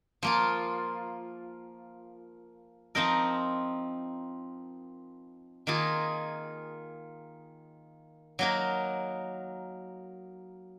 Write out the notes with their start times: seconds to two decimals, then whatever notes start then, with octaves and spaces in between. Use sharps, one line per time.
0.23 F3 A#3 F4
2.95 F3 C4 D#4 A#4
5.67 D#3 A#3 F4 G#4
8.39 F#3 A#3 D#4 A#4